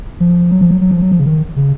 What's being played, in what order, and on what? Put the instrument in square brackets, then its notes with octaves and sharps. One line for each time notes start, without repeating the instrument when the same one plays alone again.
[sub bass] F3
F#3
F3
F#3
F#3
F3
F#3
F3
C#3
D#3
C#3